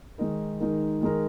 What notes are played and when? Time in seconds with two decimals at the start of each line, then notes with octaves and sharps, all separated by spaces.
0.18 D#3 G#3 D#4 A#4
0.60 D#3 G#3 D#4 A#4
1.02 D#3 G#3 D#4 A#4